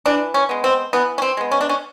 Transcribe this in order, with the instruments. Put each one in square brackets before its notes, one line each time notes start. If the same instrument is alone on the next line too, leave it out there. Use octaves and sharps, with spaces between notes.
[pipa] E3 D4
C#4
G#3 B3
C4
E3 B3
C#4
C4
G#3 B3
C#4
D4
C#4